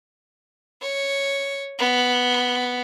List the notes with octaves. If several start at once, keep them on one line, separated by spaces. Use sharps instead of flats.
C#5
B3